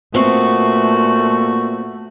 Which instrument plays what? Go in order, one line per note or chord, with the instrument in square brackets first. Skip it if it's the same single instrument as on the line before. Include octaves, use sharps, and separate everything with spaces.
[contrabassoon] A#2 [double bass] A3 [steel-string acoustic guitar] B3 C4 [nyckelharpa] F#4